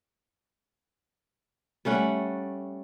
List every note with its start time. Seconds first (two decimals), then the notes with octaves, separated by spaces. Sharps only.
1.85 G3 A3 C#4 F#5